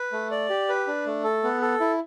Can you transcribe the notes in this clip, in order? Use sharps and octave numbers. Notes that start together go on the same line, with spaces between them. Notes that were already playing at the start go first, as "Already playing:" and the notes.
Already playing: B4
A3
D5
G4
B4
D4
A3
A4
B3
A4
E4